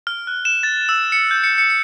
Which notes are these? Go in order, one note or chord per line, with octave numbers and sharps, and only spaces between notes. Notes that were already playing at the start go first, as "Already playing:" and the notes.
F6
F#6
E7
A6
E6
C#7
G6
C#7
C#7
C#7